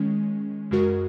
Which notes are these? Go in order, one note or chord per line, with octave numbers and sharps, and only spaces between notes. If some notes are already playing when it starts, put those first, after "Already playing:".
Already playing: D#3 G#3 C#4
F#2 C#3 G#3 F#4 A#4